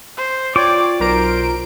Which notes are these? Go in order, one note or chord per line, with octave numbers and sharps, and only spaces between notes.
C5
F4 C#5 D5 G5 D6
B1 A#4 C5 D7